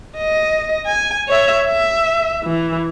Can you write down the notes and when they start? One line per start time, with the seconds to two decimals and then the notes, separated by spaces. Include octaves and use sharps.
0.17 D#5
0.86 G#5
1.28 C#5 E5
1.65 E5
2.44 E3